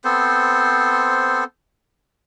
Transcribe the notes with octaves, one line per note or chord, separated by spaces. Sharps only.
B3 C4 A4 C5